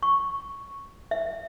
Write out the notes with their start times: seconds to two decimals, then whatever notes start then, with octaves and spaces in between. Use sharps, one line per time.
0.03 C#6
1.11 E5